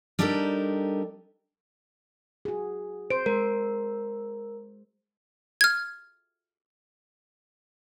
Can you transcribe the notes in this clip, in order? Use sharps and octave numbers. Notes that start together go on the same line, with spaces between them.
G3 D4 D#4 G4 A4 A#4
F#4 G#4
C5 D7
G#3 A#4
F6 G#6